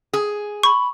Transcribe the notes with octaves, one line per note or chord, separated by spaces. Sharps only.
G#4
B5 C#6